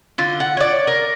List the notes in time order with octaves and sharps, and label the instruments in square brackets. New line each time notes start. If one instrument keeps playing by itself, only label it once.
[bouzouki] D3 F4
F#5
C#5 D5
A#4